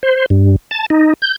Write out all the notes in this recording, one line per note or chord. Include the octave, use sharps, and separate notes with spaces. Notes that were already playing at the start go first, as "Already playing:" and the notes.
C5
G2
A5
D#4
G6